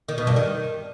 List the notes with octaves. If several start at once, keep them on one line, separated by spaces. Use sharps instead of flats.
D#3
B2
G2
D#3